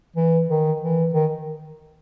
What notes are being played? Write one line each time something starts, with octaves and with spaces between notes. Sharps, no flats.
E3
D#3
E3
D#3